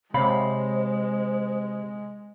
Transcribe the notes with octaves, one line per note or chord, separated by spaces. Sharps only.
C3 G#3 C5 C#5 F5 B5